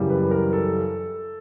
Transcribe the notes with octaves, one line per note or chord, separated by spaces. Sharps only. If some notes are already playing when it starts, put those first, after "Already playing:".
Already playing: F#2 C#3 E3 G3
B4
A#4
A4